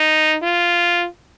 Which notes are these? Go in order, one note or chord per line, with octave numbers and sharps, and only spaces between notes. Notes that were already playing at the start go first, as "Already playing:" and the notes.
Already playing: D#4
F4